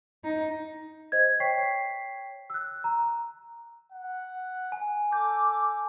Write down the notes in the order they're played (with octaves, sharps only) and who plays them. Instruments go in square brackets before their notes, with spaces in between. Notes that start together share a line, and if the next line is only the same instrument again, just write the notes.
[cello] D#4
[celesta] C5 D#5 G#6
C#5 G5 C#6 B6 C7
E6 F#6
A#5
[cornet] F#5
[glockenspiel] G#5
[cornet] A4 [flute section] D6 [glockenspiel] G6